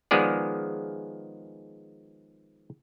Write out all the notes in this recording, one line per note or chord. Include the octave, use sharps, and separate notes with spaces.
D#3 F3 G#3 B3 G#4 D5